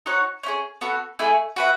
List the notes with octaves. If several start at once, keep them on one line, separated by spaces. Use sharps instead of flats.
D#4 F#4 C#5 F#5
C#4 E4 G#4
B3 F#4 A4
A3 E4 G#4 D#5
F#4 B4 E5